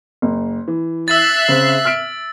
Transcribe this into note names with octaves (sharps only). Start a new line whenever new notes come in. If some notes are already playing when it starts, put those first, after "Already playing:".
F#1
E3
E5 E6 F#6 A6 C7
C#3 C4
F6 B6 D7